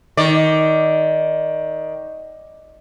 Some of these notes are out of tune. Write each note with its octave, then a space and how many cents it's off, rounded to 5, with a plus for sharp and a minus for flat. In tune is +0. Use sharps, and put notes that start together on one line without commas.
D#3 +15 D5 +0